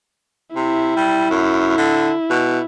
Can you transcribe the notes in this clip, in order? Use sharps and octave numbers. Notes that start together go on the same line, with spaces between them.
C3 E4
G3
F#2
D3
B2